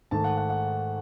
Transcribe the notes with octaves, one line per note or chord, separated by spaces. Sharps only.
G#2 D#3 A3 A5
F#5
F#5
F#5